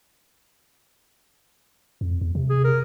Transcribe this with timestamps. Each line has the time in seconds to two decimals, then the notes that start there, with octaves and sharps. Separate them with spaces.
2.01 F2
2.21 E2
2.35 C3
2.50 G#4
2.64 A#4